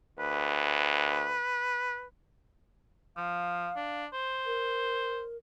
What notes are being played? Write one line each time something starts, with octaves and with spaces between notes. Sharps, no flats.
D2 B4
F3 F5
D4
C5
A#4